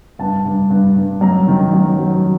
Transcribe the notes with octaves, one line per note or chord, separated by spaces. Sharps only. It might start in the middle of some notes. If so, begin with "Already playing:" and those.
G2 A5
G2
G2
G2
F#2 A#5
D#3
F#2
F#3